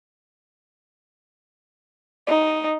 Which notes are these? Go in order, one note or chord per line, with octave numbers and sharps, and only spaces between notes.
D#4